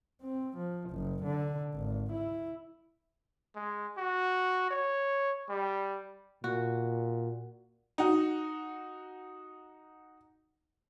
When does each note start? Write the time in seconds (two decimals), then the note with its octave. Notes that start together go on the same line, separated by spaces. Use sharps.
0.22 C4
0.57 F3
0.90 F#1
1.24 D3
1.74 G#1
2.12 E4
3.56 G#3
3.97 F#4
4.71 C#5
5.49 G3
6.44 A#2 F#4
7.98 D#4 F#4